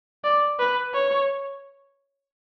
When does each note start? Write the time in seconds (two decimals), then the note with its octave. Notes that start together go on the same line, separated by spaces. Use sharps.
0.24 D5
0.59 B4
0.94 C#5